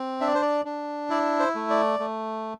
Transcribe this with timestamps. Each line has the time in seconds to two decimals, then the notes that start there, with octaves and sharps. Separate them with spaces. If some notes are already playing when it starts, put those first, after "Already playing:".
Already playing: C4
0.21 D4 E5
0.27 D5
0.35 C5
0.42 D5
0.65 D4
1.10 E4 D5
1.40 C5
1.55 A3
1.70 D5
1.99 A3